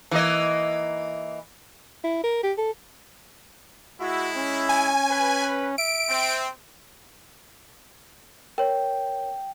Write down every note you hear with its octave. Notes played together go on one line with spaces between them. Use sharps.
E3 A#3 D#5
E4
A#4
G4
A4
G#3 E4 F#4
C#4
G#5
B4
E5 D7
C4
A#4 C#5 G5